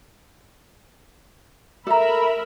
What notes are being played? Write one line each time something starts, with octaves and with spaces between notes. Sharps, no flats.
A4 A#4 E5 A#5 B5